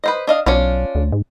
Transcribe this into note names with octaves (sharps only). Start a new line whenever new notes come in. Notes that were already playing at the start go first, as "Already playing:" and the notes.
B4 C5 D#5
D4 D#5 F5
B1 C#4 D4 F4
D2
G#2